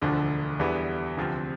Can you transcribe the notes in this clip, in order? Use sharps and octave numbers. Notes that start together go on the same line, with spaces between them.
E1 D2 D3 F3
E2 D3 G3 B3 E4
D2 C3 F3 C4